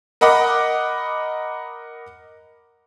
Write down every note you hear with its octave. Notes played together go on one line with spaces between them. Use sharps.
A#4 D#5 F#5 B5 D6